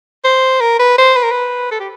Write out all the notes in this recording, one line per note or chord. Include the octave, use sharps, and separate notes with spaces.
C5
A#4
B4
C5
B4
A#4
B4
A4
G4